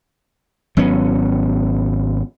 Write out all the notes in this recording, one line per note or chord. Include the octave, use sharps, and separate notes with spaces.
G#1 F#3 B3 C#4